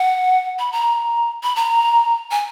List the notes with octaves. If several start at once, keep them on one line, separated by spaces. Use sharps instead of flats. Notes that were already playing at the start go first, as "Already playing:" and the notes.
Already playing: F#5
B5
A#5
B5
A#5
G#5